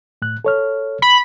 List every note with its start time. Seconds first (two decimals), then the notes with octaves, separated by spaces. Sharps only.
0.22 A2 F#6
0.45 A4 C#5 F6
1.02 B5